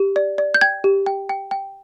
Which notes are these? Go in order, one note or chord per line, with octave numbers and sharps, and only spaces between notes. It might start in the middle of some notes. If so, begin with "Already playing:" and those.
Already playing: G4
D5
D5
G6
G5 G#6
G4
G5
G5
G5